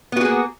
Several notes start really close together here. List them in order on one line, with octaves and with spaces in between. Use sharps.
B3 F#4 G#4 A#3